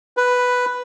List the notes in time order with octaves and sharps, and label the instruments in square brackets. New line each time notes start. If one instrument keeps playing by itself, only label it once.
[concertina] B4